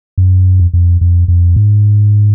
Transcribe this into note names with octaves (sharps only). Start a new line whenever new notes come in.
F#2
F2
F2
F2
F2
G#2